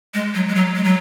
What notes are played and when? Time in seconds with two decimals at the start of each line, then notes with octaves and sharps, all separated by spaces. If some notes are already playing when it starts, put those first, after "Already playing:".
0.14 G#3
0.35 F#3
0.48 G#3
0.55 F#3
0.76 G#3
0.84 F#3